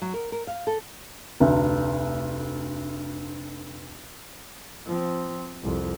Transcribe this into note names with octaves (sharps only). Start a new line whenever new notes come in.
F#3
A#4
A#4
F5
A4
F1 D2
F3 C4
C2 F2